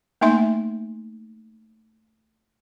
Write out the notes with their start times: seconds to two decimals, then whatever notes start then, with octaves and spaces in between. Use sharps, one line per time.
0.21 A3 A#3 D#4 E5 C6